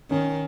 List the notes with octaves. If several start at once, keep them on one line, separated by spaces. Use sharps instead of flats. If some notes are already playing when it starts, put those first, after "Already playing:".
D#3 C#4